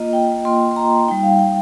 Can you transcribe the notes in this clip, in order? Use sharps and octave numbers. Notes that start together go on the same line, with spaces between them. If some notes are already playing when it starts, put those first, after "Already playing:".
Already playing: A#3 F4 D#5
G5
A#3 F4 C6
C6
A#5
G3 D#4 G5
F5
G5